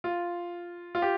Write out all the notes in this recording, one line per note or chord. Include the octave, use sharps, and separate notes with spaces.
F4
F4
G4